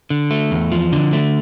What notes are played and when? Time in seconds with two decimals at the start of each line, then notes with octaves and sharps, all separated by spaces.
0.10 D3
0.31 A3
0.51 E2
0.72 F3
0.93 D3
1.13 A3